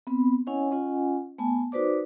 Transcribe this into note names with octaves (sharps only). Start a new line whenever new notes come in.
B3 C4 B5
C#4 E4 C#5 D#5 F#5 G#5
C#4 F4 D#5 F#5 G#5
A3 B3 G#5 A5
D#4 F#4 B4 C5 D5 D6